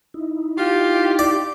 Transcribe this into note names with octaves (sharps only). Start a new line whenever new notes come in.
D#4 E4
F4 G4
D5